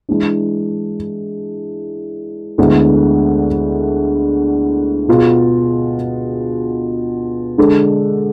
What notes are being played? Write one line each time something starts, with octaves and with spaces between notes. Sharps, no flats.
E3 G#3 D4
D2 D3 G#3 B3 E4
B2 B3 F4 G#4
D3 G#3 D4 A4